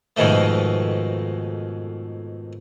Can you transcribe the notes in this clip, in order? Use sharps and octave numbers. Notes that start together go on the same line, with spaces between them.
F2 G#2 B2 D#3 A3